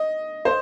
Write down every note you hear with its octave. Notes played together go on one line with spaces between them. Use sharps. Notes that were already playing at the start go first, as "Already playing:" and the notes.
Already playing: D#5
C5